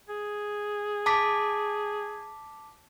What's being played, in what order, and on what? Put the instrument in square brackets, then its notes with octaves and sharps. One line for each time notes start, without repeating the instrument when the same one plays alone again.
[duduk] G#4
[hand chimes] A5 D6 B6